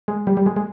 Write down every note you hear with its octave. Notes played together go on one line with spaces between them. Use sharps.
G#3
G3
G3
G#3
G#3